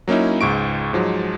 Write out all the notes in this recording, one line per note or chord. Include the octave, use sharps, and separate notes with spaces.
F#3 A#3 C#4 D#4 E4
C#2 G#2 C#6 D7
G#2 F3 F#3 G#3